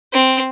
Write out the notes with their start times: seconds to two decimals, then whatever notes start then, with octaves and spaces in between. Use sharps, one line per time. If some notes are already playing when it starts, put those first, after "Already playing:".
0.13 C4